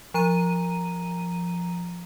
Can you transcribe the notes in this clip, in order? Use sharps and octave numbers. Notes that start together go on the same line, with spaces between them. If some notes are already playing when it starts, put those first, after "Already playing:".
F3 A#5 D#7